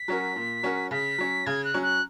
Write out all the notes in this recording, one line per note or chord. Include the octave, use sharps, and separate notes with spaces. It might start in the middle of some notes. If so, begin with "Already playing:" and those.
Already playing: B6
F#3 C#4 F#4 A#4
A#2
F#3 C#4 F#4 A#4
C#3 B6
F#3 C#4
C#3 G#6
F#6
F#3 C#4
F#6